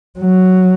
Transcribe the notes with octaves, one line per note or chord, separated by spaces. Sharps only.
F#3